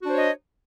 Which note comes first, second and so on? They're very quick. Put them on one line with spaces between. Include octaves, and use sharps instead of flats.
F#4 D4 C5 C#5 D#5